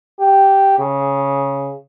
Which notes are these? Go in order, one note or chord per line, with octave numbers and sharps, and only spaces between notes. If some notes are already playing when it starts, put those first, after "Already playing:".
G4
C#3